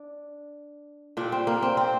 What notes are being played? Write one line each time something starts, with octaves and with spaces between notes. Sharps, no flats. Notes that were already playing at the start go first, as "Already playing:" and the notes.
Already playing: D4
A#2 G3 D4
C4
A#3
C4
C4